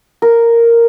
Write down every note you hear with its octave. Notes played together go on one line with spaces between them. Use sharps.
A#4